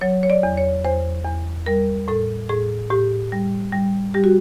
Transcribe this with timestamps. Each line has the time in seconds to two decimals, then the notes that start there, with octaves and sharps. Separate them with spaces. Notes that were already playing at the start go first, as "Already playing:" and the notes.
0.01 F#3 C#5
0.23 C#5
0.30 D5
0.43 E2
0.58 C#5
0.85 E2 C5
1.25 E2
1.66 G3 A#4
2.08 A2 A4
2.49 A2 G#4
2.90 A2 G4
3.32 G3
3.73 G3
4.14 G3 G4
4.24 F#4